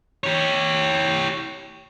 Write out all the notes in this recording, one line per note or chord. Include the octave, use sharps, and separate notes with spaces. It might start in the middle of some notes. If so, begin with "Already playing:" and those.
G4 C#5